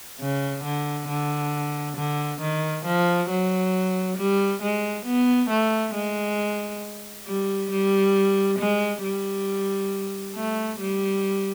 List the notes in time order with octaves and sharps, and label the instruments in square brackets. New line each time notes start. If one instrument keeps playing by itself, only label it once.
[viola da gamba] C#3
D3
D3
D3
D#3
F3
F#3
G3
G#3
B3
A3
G#3
G3
G3
G#3
G3
A3
G3